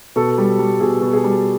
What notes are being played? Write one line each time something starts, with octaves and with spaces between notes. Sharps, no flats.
B2 A4
G3
G3
B2 G#4
B2
G#4
G3